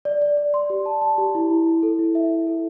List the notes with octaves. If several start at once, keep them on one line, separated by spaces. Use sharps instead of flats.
D5
D5
D5
C6
G4
A5
A5
G4
E4
E4
E4
A4
E4
E5
E4
A4